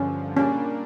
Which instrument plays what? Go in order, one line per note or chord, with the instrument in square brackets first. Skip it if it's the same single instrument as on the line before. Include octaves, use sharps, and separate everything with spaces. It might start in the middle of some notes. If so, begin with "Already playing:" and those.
Already playing: [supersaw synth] G2 D3 F3 [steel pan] C#4
[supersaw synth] A#2 G3 A#3 D4 [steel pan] C#4